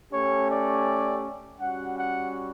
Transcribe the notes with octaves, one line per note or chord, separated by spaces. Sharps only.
A3 C#4 G4 C#5
D5
G3 C#4 F#4 F#5
F#5